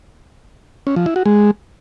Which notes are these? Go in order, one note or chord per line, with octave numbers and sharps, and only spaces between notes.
C#4
F3
E4
F#4
G#3